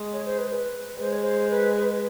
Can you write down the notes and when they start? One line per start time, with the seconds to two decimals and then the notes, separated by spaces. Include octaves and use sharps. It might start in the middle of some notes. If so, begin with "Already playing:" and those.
Already playing: G#3
0.13 C#5
0.25 C5
0.38 B4
0.51 B4
1.00 G#3 C5
1.12 C#5
1.24 C5
1.51 B4